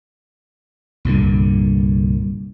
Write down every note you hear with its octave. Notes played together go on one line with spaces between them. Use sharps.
C2 G2 A#2 D3